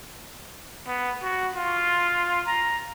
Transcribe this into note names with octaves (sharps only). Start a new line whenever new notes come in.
B3
F#4
F4
A#5